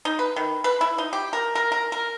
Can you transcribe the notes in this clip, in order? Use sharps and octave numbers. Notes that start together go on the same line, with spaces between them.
D#4
B4
D#3
B4
E4
D#4
G4
A#4
A#4
A#4
A#4